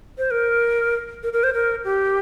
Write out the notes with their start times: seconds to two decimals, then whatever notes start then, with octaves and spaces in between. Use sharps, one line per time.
0.18 C5
0.31 A#4
1.23 A#4
1.33 A#4
1.43 C5
1.54 A#4
1.85 G4